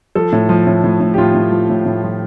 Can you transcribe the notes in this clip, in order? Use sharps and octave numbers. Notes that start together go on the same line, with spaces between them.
F3 A4
A2
F3
A2
A2
A2
G4
A2 F4
A2
F3
A2
A2
F3